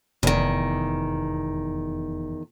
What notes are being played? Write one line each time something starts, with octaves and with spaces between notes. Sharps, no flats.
F1 E2 D#3